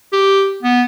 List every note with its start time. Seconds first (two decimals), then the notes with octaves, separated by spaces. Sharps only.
0.13 G4
0.63 B3